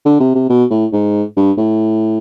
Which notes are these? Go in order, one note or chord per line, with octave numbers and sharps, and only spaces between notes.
D3
C3
C3
B2
A2
G#2
G2
A2